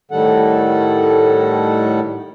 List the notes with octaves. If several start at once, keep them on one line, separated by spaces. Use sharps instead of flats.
A2 D#3 G3 A4 F#5